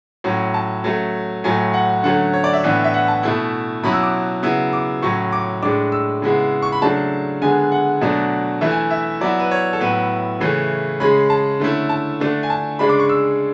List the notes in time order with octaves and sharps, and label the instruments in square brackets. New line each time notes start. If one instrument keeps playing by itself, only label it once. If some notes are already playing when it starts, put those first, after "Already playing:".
[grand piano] A2 F#3 C#4
A5
F#3 A3 C#4
A2 F#3 A3 G#5
F#5
D3 F#3 A3 C#4 F#5
C#5
D5
E5
A2 E3 B3 D4
E5
F#5
A5
B2 A3 E4
B2 F#3 C#4 E4 B5
E6
D6
C#3 F#3 B3 E4
D6
A2 F#3 C#4 C#6
D6
A2 G#3 D4 D6
E6
C#3 G#3 B3 E4
C#6
B5
C#3 F#3 A3 D4 A5
D3 G#3 B3 G#5
F#5
B2 F#3 A3 D4
E3 A3 E4 E5
G#5
E5
F#3 B3 E4 D5
B4
C#5
A4
A2 F#3 B3 E4 B4
C#3 E3 A3 C#4
C#3 G#3 C#4 B5
A5
D3 A3 C#4 E4
A5
D3 A3 D4
G#5
A5
C#3 G#3 D4 B5
D6
C#6
E6